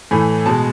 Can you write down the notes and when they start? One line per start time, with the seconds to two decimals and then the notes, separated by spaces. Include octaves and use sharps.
0.11 A2 E3 A3 G#5
0.46 B2 G#3 A5